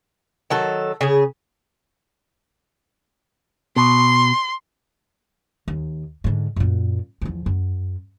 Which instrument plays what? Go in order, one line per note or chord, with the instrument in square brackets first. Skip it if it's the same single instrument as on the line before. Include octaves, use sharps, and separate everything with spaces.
[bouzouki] D#3 F#3 A4
C#3 G#4
[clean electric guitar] B2 [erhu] C6
[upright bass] D#2
G#2 D3
F#2 A#2
E2 F3
F#2